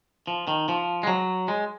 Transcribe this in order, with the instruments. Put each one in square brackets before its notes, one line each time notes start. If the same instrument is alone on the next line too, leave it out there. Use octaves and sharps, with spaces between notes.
[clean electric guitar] F3
D#3
F3
G#3
F#3
G#3